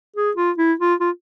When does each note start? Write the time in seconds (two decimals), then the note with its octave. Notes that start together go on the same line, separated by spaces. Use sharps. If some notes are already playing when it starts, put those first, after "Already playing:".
0.16 G#4
0.36 F4
0.58 E4
0.80 F4
1.00 F4